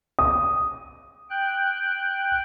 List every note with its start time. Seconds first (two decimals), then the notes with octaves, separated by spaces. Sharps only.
0.19 D#6
1.30 G5 F#6